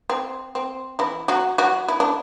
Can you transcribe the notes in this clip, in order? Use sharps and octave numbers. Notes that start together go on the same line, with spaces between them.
C4
C4
E3 E4
F#3 F#4
F#3 F#4
E4
D4